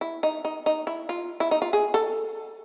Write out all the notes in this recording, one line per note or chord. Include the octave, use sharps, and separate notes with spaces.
E4
D#4
D#4
D#4
E4
F4
E4
D#4
F4
G#4
A4